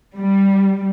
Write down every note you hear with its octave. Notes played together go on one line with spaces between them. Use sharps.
G3